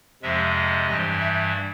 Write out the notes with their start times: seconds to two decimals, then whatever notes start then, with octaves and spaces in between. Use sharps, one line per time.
0.22 F2 C3 F3 G#3 E5
0.88 G2 E3 G3 D#5
1.19 E5